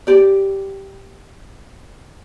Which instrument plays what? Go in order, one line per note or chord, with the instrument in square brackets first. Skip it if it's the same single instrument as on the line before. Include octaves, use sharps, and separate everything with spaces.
[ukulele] G4 D5